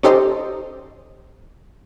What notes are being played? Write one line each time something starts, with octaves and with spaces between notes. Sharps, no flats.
C#4 D#4 G4 A4 C5 D#5